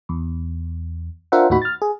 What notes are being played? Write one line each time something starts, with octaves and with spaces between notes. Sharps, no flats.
E2
D4 F4 A#4 C5 E5 F#5
D#2 A2 D#4 F#4 B5
F6 A6
G#4